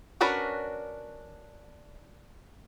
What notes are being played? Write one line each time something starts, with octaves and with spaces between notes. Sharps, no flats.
C#4 D4 F#4 A#4 B4